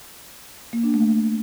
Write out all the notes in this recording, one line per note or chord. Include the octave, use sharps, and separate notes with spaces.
A#3
D4
A3